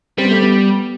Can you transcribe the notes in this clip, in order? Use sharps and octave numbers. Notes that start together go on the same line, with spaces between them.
G3 C4
B3
A3
B3